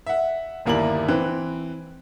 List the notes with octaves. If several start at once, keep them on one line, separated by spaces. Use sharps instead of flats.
E5 F#5
G1 D#2 A#3 E4 D5 F#7
E3 C4 F#6